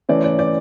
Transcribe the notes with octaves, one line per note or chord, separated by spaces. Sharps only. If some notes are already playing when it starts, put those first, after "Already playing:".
E3 A3 C#4 D5
D5
D5